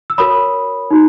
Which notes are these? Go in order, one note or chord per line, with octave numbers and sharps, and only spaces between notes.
E6
F#4 A#4 C#5 B5 D#6
D#4 F#4